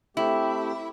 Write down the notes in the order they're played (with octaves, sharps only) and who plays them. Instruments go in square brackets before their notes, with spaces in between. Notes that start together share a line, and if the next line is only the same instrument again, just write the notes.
[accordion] A3 C4 G4 [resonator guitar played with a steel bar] E4